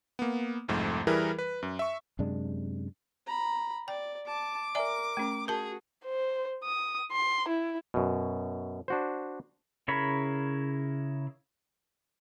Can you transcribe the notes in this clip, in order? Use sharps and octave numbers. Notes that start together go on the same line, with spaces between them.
A#3 B3
C2 F2 G#2 A3
E3 G3 E4 G#4 A#4 B4
B4
F#2
E5 C#6
F#2 C3 G#3 D4
A#5 B5
D5 G5
A5 D6
A#4 D5 E5 G#5
A3 C#4
F#4 G#4 A#4 A5
C5
D#6
C6
E4
F#2 B2
D4 F#4 C5
C#3 E4 A#4 C#5 B5